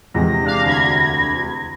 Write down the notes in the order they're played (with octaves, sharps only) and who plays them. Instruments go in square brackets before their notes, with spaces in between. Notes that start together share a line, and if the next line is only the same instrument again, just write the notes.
[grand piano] E2 C3 G#3 [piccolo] A#6
[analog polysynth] D4 F5
D2 B5 G#6